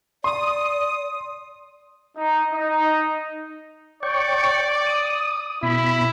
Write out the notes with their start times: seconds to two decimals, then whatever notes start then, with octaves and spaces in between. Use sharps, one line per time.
0.24 D5 C6 D#6
2.17 D#4
2.53 D#4
4.03 C#5 D5 G5 C#6
4.86 D#6
5.63 B2 E4 B5